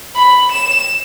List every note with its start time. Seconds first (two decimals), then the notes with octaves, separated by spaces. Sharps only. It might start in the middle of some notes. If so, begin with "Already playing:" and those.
0.16 B5
0.52 E7